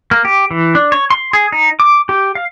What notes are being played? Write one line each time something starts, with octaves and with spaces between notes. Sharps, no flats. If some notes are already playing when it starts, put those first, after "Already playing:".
A#3
G4
E3
D4
C#5
C6
G#4
D#4
D6
G4
F5